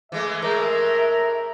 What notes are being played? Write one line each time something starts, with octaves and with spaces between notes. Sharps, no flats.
E3 G#3 A3 E5
A2 G#3 A#4